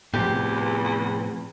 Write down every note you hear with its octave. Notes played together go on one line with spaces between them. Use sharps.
E2 A2 C3 F3 G4